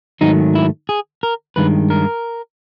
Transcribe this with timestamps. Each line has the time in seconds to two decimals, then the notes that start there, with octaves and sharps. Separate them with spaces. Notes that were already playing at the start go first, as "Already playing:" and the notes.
0.21 G#2 D#3 F#3 A3 D#4
0.55 E4
0.89 G#4
1.23 A#4
1.56 G2 D#3 G#3 B4
1.90 A#4